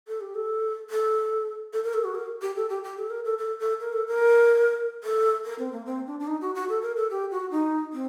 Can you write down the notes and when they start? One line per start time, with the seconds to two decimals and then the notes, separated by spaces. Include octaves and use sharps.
0.08 A4
0.21 G4
0.35 A4
0.90 A4
1.73 A4
1.84 A#4
1.94 A4
2.04 F#4
2.15 A#4
2.42 G4
2.56 A4
2.69 G4
2.84 G4
2.97 A4
3.10 A#4
3.25 A4
3.38 A4
3.59 A4
3.80 A#4
3.93 A4
4.08 A#4
5.04 A4
5.45 A#4
5.59 C4
5.72 A#3
5.86 C4
6.07 D4
6.20 D4
6.27 D#4
6.41 F#4
6.55 F#4
6.69 A4
6.82 A#4
6.97 A4
7.10 G4
7.31 F#4
7.51 D#4
7.93 C4